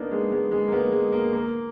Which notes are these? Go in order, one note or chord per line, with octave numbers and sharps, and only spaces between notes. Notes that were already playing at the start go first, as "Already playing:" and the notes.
Already playing: A#3 B3 D4 D#4
G#3 B3
G#3 B3
G#3 B3
A#3
G#3 B3
G#3
A#3
A#3